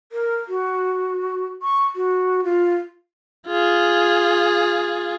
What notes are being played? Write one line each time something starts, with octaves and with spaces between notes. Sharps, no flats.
A#4
F#4
C#6
F#4
F4
F4 G#4